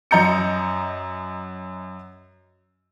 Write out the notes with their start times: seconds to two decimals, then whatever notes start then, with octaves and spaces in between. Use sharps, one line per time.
0.11 F#2 D#5 A#5 G6 C#7